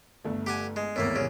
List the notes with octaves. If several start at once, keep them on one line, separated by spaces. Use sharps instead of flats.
G1 A3
G4 F#5 G#5
G#3
G#1 E2 A2 A3 A#3
C2 C#3